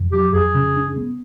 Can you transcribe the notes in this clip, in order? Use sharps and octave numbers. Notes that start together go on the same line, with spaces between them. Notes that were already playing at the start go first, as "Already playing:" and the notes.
Already playing: F2
F#3 G4
F2 G#4
C#3
D4
B3